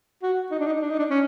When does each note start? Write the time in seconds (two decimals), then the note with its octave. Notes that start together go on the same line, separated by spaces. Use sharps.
0.23 F#4
0.51 D#4
0.59 D4
0.66 D#4
0.81 D4
0.90 D#4
0.99 D4
1.10 C#4